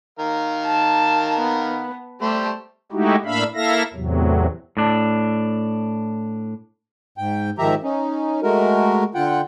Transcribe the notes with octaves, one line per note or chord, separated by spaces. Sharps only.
D#3 A#4 F5
A5
B3
G3 A3 G4 C5
G#3 A3 D#4 E4 F#4 G4
A2 A#3 D4 E5 F5 B5
A#3 E4 A4 E5 F5 A#6
E2 A2 C3 F#3
A2 D4
G#2 G5
G#2 D#3 F3 G4 E5 A#5
C#4 D#4
G#3 A3 F#4 A#4
D3 F4 F#5 G5